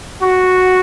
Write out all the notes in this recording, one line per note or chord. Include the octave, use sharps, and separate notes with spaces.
F#4